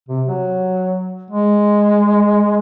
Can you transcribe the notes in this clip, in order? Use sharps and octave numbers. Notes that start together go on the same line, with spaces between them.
C3
F#3
G#3